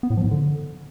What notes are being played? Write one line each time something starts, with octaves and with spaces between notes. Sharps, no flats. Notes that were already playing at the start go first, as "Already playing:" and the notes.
B3
A2
F3
G#2
D3